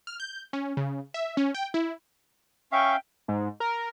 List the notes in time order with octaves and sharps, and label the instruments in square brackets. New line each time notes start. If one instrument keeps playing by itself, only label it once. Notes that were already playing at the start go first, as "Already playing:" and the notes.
[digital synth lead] F6
G6
C#4
C#3
E5
C#4
G5
E4
[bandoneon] C#4 E5 F5 [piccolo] G5 [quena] C#6
[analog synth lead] G#2
A#4